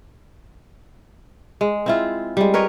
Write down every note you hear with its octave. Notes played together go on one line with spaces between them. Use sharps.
G#3
C4 E4 F4
G3 G#3
A#4 B4 C#5 D#5